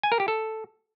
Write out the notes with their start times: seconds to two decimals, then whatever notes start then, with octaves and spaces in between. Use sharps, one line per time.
0.03 G#5
0.12 A#4
0.20 G4
0.28 A4